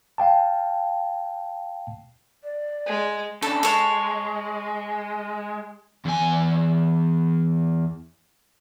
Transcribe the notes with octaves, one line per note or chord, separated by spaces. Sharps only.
F5 G5 A5
D5
G#3
C#3 D4 A4
G#3 A4 C#5
E2 G#5